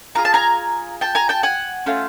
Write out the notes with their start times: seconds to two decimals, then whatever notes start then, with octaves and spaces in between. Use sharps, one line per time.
0.15 D4 F4 G#4 A#5
0.25 A5
0.34 G#5 A#5
1.01 G5 A5
1.15 G#5 A#5
1.29 G5 A5
1.43 F#5 G#5
1.86 A3 C#4 F4